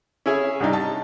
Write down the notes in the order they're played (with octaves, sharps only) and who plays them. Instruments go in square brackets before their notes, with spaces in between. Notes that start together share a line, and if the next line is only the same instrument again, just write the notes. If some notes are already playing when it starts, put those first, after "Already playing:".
[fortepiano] C#4 E4 G#4
[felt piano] C2 D4 D#4
A5